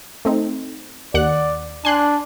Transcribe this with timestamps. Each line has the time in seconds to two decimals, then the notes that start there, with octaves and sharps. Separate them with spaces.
0.25 A3 C4 D#4
1.14 D#2 D5 F#5 F#6
1.85 D4 G#5 C6 F#6